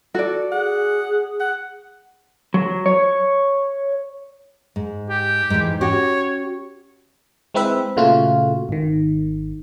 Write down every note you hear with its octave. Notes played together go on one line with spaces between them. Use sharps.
F#4 A4 D5
G#4 F#5
F#5
F#3
C#5
G#2
G4
G#2 E3
C#4 F#4 G4 C#5
G#3 C4 E4 B4 E5
A#2 C#3 A3 F4 F#4
G#1 D#3